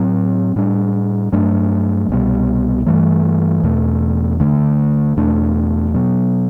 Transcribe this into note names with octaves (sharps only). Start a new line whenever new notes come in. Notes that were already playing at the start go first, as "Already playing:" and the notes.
Already playing: A2 F#3 C4
A2 G3 D4
G2 F#3 A3 D4
C2 B2 G3
G2 E3 A3
E2 B2 A3
D2 D3 A3 D4
E2 B2 A3 D4
B2 F#3 B3